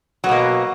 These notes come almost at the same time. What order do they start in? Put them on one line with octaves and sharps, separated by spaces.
F#3 B3 B2 A#3